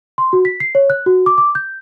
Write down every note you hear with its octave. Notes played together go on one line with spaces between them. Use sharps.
C6
F#4
B6
C7
C#5
F#6
F#4
D6
D6
G6